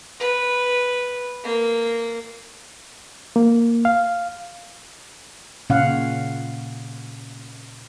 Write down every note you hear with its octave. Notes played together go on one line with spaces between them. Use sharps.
B4
A#3
A#3
F5
A#2 C#3 C#4 F5 F#5